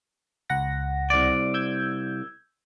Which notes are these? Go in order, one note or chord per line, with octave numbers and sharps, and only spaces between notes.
C#2 F#5 A#6
C2 D5
E6 G6 G#6